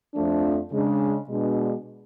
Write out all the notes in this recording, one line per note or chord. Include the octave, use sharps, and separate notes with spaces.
F2 F3 A3 D4
C#3 G#3 D4
B2 G#3 D4